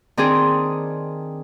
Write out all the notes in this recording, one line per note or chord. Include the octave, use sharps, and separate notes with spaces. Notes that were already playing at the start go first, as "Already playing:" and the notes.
D#3 C4 D4 G#4